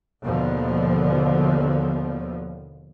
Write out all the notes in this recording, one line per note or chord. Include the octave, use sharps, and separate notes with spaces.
D#2 B2 D3 F3